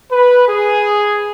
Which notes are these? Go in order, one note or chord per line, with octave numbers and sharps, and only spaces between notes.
B4
G#4